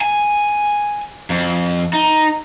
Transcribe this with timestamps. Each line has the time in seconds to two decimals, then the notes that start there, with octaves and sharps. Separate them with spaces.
0.01 G#5
1.30 F2
1.93 D#4